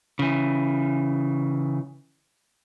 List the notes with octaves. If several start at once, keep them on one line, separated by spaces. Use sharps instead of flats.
C#3 E3